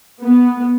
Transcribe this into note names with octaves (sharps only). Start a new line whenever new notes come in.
B3